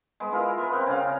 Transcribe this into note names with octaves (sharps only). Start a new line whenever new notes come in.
G#3 B3
E4 F4 A#4
B3 A#4
C4 F#5
C#3 D5 F5